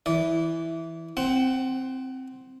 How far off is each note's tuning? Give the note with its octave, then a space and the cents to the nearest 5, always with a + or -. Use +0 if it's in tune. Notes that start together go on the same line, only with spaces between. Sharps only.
E3 -5 D5 -30
C4 +0 F#5 +25